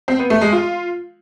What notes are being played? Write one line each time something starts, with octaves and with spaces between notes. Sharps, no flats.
C4
B3
A3
G#3
F4